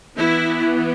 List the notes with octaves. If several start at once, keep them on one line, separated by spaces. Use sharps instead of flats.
E3 B3 E4